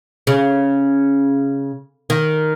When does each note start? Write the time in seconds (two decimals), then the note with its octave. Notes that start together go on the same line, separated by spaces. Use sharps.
0.27 C#3
2.10 D#3